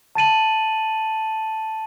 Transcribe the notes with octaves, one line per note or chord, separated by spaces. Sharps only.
A5 A6 D#7 F#7